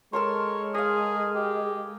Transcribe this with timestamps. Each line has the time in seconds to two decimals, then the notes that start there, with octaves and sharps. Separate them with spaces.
0.13 G#3 A4 A#4 C#5 C6
0.74 G#4 D#5 F5
1.35 G4